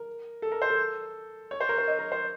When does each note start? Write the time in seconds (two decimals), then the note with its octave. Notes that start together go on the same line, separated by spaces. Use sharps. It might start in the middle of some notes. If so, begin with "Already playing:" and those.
Already playing: A#4
0.42 A4
0.52 A#4
0.62 C5
0.70 A4
1.51 C#5
1.61 C5
1.69 A#4
1.78 C5
1.87 D#5
1.99 A#4
2.12 C5